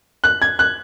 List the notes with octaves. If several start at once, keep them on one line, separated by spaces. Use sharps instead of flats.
F#6
G#6
F#6